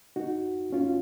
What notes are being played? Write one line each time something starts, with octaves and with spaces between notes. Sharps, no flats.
D#4 F#4
C#4 F4